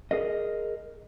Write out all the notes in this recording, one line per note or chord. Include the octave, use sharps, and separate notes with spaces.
G#4 A#4 D#5